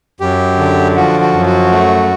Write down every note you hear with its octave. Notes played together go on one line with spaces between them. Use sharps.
F#2 G4
D3
F3 F#4
F#4
F#2
F#4
A3